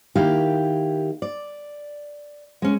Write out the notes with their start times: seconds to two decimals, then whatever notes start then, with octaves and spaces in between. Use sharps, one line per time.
0.15 D#3 A#3 E4 G4 F5 G5
1.22 D5
2.62 G#3 C#4